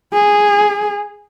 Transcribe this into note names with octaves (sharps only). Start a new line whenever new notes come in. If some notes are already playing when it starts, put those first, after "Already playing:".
G#4